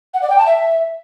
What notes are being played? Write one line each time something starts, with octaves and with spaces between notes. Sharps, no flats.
F#5
D5
G5
A5
E5